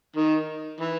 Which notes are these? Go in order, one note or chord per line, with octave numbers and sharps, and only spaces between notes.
D#3
E3